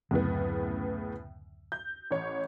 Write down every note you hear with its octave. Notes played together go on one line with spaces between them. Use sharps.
D1 F#2 A2 C#3 B3 C4
G6
A1 C#5